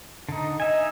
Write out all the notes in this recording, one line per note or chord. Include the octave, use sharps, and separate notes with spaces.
D3 D#4
D#4 D#5 E5 G#5